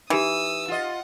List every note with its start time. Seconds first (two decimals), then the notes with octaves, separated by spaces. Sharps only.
0.10 E3 D#4 G4 D#6 E6
0.68 F4 D#5 F#5